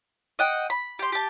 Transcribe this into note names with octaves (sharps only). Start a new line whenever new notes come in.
D#5 F#5 G5
B5
G4 C6
G4 A5